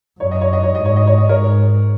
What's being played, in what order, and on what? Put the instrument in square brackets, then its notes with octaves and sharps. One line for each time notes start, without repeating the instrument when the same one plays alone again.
[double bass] F#2 [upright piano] C#5
[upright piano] D#5
C#5
D#5
C#5
[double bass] G#2 [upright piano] D#5
[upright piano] C#5
D#5
C#5
D#5
[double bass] G#2 [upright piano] A#4 C#5